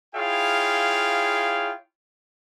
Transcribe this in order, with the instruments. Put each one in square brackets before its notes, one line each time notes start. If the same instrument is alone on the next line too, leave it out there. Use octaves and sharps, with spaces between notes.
[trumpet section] E4 F4 G#4 C#5 F5 G5